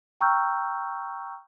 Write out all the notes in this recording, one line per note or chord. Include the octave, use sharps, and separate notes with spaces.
G5 A#5 C#6 E6 F6 G6